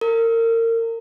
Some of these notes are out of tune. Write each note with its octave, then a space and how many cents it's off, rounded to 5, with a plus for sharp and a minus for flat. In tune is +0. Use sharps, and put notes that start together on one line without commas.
A#4 -30